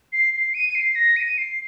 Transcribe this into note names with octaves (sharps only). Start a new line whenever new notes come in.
C7
C7
D#7
D#7
C7
A#6
D#7
C7